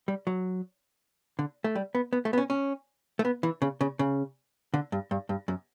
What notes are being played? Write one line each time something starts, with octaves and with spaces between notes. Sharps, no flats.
G3
F#3
D3
A3
G3
B3
B3
A3
B3
C#4
C#4
A3
B3
E3
C#3
C#3
C#3
D3
G2
G2
G2
F#2